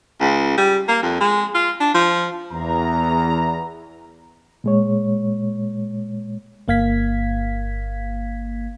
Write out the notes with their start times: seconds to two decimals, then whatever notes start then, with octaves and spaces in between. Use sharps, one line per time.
0.21 C#2
0.58 G3
0.88 A#3
1.02 F2
1.20 G#3
1.55 F4
1.80 D4
1.94 F3
2.52 E2 A#5
4.64 A#2 G#3 C#5
6.68 G1 A#3 F5 G#6 B6